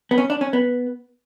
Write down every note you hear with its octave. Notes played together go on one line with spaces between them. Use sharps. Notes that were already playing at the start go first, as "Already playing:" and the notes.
B3
C#4
D4
C#4
B3